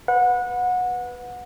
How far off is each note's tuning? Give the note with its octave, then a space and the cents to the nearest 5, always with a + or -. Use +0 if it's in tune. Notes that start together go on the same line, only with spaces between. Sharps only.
B4 +0 F#5 -25